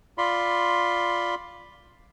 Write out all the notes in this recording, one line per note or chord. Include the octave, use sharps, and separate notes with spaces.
F4 D5 B5 C6